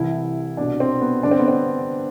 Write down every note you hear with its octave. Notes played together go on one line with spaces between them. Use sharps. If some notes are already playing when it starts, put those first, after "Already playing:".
Already playing: C2 C3 E3 E4
C2 B2 D4
C4
B3
G2 D3 D4
C4
B3
C4